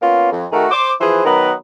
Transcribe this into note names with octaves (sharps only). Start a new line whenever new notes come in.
A#3 B3 C#4 F4
F2
D#3 A3 F#4 G#4 A#4
C5 D6
E3 F3 G#4 B4 C5
D#3 F#3 B3 A#4 B4